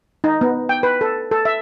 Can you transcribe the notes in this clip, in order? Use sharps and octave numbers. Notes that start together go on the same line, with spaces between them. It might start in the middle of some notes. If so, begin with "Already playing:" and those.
D#4
B3
G5
B4
A4
A4
E5